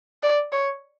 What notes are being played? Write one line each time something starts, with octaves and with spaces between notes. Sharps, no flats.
D5
C#5